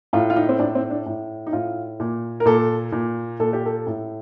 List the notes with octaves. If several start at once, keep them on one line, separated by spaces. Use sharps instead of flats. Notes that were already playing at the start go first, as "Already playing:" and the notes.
A2 F4
F4
D#4
C4
A2 D4
C4
D4
A2
D#4
A2 F4
A#2
A#4
A#2 A4
A#2
A#2 A4
G4
A4
A2